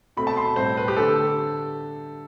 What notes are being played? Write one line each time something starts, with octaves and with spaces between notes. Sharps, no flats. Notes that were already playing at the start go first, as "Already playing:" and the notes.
B2 A3 C4 B5
A5
C6
A2 G3 C4 C5
B4
G4
D3 A3 A4